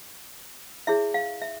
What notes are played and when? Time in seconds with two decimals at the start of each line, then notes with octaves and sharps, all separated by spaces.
0.87 E4 G#4 C#5 E5
1.14 F5
1.42 E5